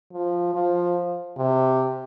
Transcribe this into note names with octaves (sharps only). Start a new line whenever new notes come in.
F3
F3
C3